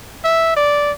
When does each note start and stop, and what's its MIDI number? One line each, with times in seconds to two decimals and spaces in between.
0.24 0.54 76
0.57 0.92 74